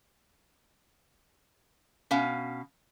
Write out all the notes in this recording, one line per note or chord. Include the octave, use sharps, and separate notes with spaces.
B2 C#4 F5